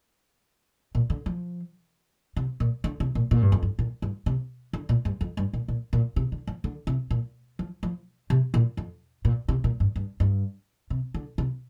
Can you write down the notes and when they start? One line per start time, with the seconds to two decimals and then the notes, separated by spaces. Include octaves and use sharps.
0.95 A#2
1.10 D3
1.26 F3
2.36 C3
2.60 A#2
2.84 D3
3.00 C3
3.15 A#2
3.31 A#2
3.42 G2
3.52 F2
3.63 G2
3.79 A#2
4.02 G2
4.26 C3
4.73 D3
4.89 A#2
5.05 G2
5.21 F2
5.37 G2
5.53 A#2
5.68 A#2
5.93 A#2
6.16 C3
6.32 D3
6.47 F3
6.64 D3
6.87 C3
7.11 A#2
7.59 F3
7.83 F3
8.30 C3
8.54 A#2
8.77 F2
9.25 A#2
9.48 C3
9.64 A#2
9.80 G2
9.96 G2
10.20 G2
10.90 C3
11.14 D3
11.38 C3